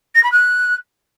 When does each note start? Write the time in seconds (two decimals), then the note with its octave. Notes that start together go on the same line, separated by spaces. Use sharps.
0.14 A#6
0.23 B5
0.31 F#6